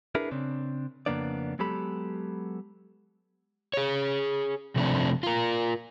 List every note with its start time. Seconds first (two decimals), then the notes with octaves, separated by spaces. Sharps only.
0.15 D4 E4 G#4 A#4 B4
0.31 C#3 C4 D4
1.06 F2 C#3 A#3 B3 D4 D5
1.59 F#3 G#3 B3 G4 A4 B5
3.74 G#4 C#5
4.76 C3 F3 A3 C4 D4
5.23 F4 A#4